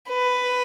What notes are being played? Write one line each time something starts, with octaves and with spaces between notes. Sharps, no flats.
B4